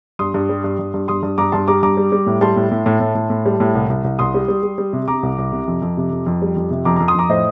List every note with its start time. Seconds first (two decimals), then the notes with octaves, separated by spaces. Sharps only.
0.19 G2 C6 D#6
0.34 G2
0.49 G3
0.64 G2
0.79 G2
0.94 G2
1.08 G2 C6 D#6
1.23 G2
1.38 G2 A#5 D6
1.52 G2 A5 C6
1.68 G3 A#5 D6
1.83 G2 A#5 D6
1.97 G3
2.12 G3
2.26 A2
2.41 G3 A5 C6
2.56 A2
2.71 A2
2.86 A2
3.00 A2
3.15 A2
3.30 A2
3.46 G3
3.60 A2
3.75 C2
3.90 C2
4.04 C2
4.19 C2 C6 D#6
4.34 G3
4.48 G3
4.63 G3
4.78 G3
4.93 C3
5.08 C3 A#5 D6
5.23 C2
5.38 C2
5.52 C3
5.68 F2
5.82 F2
5.97 C3
6.12 F2
6.26 F2
6.42 G3
6.57 F2
6.71 C3
6.85 F2 A#5 D6
6.96 F2 A#5 D6
7.08 C6 D#6
7.15 F2 A#5 D6
7.29 A2 C5 D#5